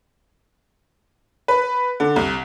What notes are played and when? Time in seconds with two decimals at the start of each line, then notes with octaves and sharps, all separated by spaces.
1.48 B4
2.00 D3
2.16 C2